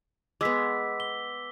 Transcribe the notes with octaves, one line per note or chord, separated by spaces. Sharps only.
G#3 B3 D6 E6 B6
G7